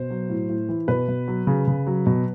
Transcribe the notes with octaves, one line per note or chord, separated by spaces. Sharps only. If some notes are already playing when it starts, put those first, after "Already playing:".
Already playing: B2 C5
F#3
A2
A2
E3
B2 B4
B2
F#3
C#3
C#3
F#3
B2